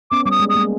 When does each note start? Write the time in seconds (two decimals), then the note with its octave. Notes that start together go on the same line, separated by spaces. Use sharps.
0.11 B3 C#4 D6
0.25 G3 D6
0.31 D#6
0.40 G#3
0.49 D#6
0.54 G#3 A#3